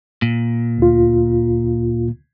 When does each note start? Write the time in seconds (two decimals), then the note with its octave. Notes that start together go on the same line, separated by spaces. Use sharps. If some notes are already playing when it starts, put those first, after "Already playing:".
0.22 A#2
0.78 D2 F4